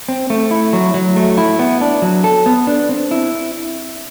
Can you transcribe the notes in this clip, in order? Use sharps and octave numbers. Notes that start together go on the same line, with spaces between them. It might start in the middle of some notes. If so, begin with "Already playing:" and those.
C4
A3
E4
F#3
F#3
A3
E4
B3
D4
F#3
A4
B3
D4
C4
E4